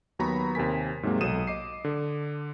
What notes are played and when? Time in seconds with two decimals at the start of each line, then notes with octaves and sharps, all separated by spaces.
0.19 D#2 F#3 B3 A#5 B5 C#6
0.55 D#2 C3 A#4 G#5 B6
1.03 G#2 C3 F#3 G#3 A#3
1.21 B1 F#3 A4 D#6 D#7 E7
1.47 D#5 D6 C7
1.84 D3